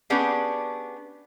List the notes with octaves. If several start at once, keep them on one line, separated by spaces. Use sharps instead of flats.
B3 C#4 D4 G4 G#4